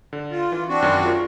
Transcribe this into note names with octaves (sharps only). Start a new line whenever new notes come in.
D3
F4
E3
C4 D4 F#4
F#2 D#3 C#4
F4 G#4 A#4